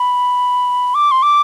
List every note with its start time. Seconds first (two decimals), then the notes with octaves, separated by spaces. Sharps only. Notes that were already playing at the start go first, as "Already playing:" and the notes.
Already playing: B5
0.95 D6
1.11 C6
1.23 D6